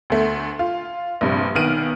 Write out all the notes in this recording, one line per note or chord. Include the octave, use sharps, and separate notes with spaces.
D2 A3
F4
A#1 G2 C3
B1 D#3 B3 F6 D7 D#7